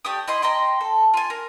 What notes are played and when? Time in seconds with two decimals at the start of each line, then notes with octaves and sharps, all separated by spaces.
0.05 A3 G4 D5 D#6
0.28 E4 D#5 C6
0.42 D#5 G5 A#5 C6
0.81 A4
1.14 F4 G#5
1.30 A#4